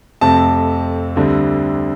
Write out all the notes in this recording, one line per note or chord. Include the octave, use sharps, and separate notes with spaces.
F2 C3 A3 C4 A5
D2 D3 G3 C4